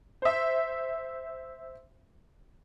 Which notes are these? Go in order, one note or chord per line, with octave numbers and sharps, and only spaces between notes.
C5 E5